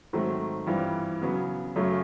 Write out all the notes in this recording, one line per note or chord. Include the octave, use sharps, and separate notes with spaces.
G#2 D#3 F#3 A3 C4
G2 E3 G3 C4 F4
C#3 F#3 B3
F#2 C#3 F#3 A3